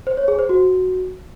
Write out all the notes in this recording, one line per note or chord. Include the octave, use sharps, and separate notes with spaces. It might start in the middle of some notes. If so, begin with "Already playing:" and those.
C5
C#5
G#4
C5
F#4